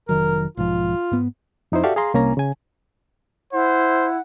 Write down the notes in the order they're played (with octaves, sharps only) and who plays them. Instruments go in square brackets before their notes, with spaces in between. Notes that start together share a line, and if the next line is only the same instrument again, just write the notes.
[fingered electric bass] F1 D#3 F#3 [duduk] A#4
[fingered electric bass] B1 G#2 F3 [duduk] F4
[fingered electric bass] G#2 B3
[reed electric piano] F2 D#4 E4 C5
F#4 G4 A4 D5 E5 F5
G#4 F5 A#5 C6
C2 A#3 C#4 G#5 A#5
C#3 G#5
[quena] E4 [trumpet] C5 [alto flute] F#5